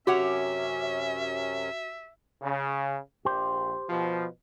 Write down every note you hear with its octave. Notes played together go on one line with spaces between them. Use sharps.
F#2 C3 C#4 F#4 G4 C#5 E5 F#5
C#3
A#1 G4 C5
B2 F3